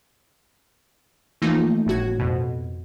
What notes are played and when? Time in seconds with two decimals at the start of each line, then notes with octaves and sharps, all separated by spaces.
1.42 E3 F3 A3 A#3 D#4 F4
1.86 G1 A2 F#4 G#6
2.19 F2 B2